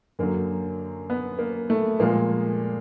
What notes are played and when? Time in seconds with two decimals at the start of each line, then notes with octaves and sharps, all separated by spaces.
0.19 F#2 D3 F#3 A#3
1.10 B3
1.39 A#3
1.70 A3
2.00 A#2 F3 G#3 A#3